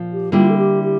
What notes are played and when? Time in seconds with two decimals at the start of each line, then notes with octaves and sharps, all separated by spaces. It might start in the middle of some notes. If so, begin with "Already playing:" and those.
Already playing: A#2 F3
0.13 G4
0.32 D3 G3 A#3 E4 F4
0.50 A4
0.58 G4
0.84 G4